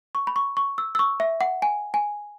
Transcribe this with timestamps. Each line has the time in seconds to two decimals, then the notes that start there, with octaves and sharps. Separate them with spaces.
0.15 C#6
0.27 B5
0.36 C#6
0.57 C#6
0.78 E6
0.95 E6
0.99 C#6
1.20 E5
1.41 F#5
1.62 G#5
1.94 G#5